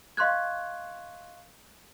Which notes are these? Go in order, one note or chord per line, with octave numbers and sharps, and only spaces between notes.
D#5 F5 C6 C#6 F#6 G#6